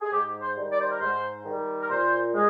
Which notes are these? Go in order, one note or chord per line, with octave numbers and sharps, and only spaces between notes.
G#4
G#2 G4
C5
D#3 G3
D5
C5
A#4
G#2 C5
D#3 G3
A#4
A#2 C5
G#3